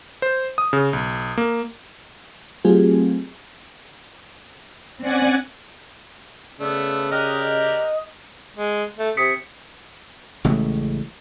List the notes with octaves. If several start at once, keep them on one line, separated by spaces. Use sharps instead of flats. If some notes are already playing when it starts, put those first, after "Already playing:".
C5
D#6
C#3
B1
A#3
F#3 A3 C4 F4 G4 G#4
C4 C#4 D5 F#5 G#5
C#3 A3 B3 D5 E6
G4 A#4 D5 D#5 G5 F6 F#6
G#3
A3
C3 D#6 B6 C#7
A1 C#3 G#3 A3